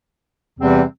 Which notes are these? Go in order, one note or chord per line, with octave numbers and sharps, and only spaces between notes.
E2 C3 E3 G3 C4